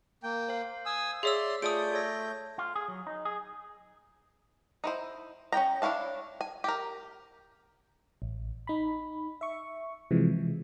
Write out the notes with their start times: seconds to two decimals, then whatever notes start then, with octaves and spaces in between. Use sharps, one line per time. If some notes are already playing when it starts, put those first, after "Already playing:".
0.23 A#3 G5
0.49 C5 F5
0.86 G#5 D#6 E6
1.23 G#4 C#5 D5 E5 C6 E6
1.62 A3 F4 G#4 D5 D#6 G6 D7
1.91 A4 C#5 A#6
2.58 F4
2.75 G#4
2.88 F#3
3.07 D#4
3.25 G#4
4.84 D#4 E4 C5
5.52 C#4 E4 G5 A#5
5.82 D4 E4 C#5 F5 A5
6.41 G#5
6.64 G4 A#4
8.22 A1
8.67 D#4 B5
9.41 E5 C#6
10.11 C3 E3 F3 G#3